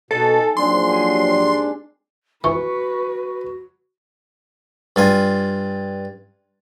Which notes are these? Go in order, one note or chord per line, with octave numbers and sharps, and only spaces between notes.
B2 D#4 A4 G#5
A#2 F3 F#3 C4 D4 G#4 C6
G4 G5 G#5
G#2 C4 D5
E3 F#4 B4 C#6
G2 F4 G#5